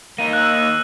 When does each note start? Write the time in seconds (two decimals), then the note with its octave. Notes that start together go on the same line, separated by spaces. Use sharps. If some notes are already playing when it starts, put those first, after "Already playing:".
0.19 A#3 D#4 D#7
0.33 E6 F#6